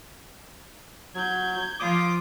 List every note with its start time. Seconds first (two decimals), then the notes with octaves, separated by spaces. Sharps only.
1.15 F#3 G6 G#6
1.80 F3 F4 D6 D#6